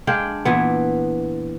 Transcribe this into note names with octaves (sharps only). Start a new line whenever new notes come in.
G#3 D4 F5 G5
A#2 E3 B3